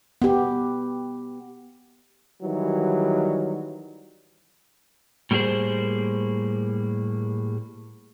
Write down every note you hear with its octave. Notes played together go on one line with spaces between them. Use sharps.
B3 G4
D#3 E3 F#3 G3
A2 G3 A#3 G4 G#4 C5